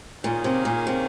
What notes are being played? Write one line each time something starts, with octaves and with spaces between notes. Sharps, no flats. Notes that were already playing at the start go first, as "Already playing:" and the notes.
A#2 D#3 A#3 C#4 G#4
C3
A#2
C3